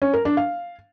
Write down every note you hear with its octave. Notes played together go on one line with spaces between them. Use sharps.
C#4
A#4
D4
F5